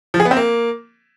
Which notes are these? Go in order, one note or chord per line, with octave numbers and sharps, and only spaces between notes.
F3
G#4
B3
C4
A#3